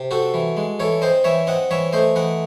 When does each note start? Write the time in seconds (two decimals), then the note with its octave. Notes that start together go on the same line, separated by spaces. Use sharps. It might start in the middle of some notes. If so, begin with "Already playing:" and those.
Already playing: C3
0.11 C4 F#4 A4
0.34 E3
0.57 G#3
0.80 E3 A4 C#5
1.02 C4 C5 D#5
1.24 E3 C#5 E5
1.47 C4 D#5 F#5
1.71 E3 C#5 E5
1.93 A3 C5 D#5
2.16 E3 D#5 F#5